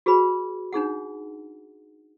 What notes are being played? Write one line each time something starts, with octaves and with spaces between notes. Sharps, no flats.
F#4 G#4 B4 B5
D4 D#4 G#4 F#5